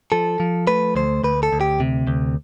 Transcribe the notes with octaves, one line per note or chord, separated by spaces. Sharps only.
F3 A4
F3
A3 B4
D2 C5
D2 B4
A4
D2
G4
C3
D2